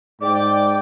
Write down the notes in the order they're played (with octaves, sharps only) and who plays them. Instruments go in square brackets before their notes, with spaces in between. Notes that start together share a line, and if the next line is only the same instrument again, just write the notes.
[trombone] G#2 [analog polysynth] D5 G5 [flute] D6